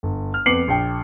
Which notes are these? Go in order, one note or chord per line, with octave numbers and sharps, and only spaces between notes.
G1
F6
F2 B3 D6 C7 C#7 F#7
A#1 G5